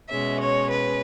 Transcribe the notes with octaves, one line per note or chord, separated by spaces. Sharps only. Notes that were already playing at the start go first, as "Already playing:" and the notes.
B2 G#3 C#4 E5
C#5
B4